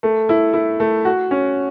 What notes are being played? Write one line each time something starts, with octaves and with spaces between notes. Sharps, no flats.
A3
E4
E4
A3
F#4
C#4